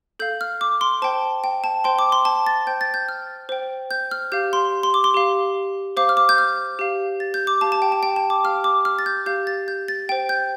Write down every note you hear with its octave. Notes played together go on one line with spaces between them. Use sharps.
A4 F5 G6
F6
D6
C6
C5 G5 A5
G5
A5
C5 G5 C6
D6
C6
A5
A6
C5 G5 G6
A6
G6
F6
C5 G5
G6
F6
G4 F5 G6
C6
C6
D6
C6
G4 F5
C5 F5 D6
F6
D6
G6
F6
G4 F5
A6
G6
D6
G4 F5 A5
A5
G5
A5
G5
A5
D6
G4 F5 F6
D6
F6
A6
G6
G4 F5 G6
A6
G6
A6
C5 G5
G6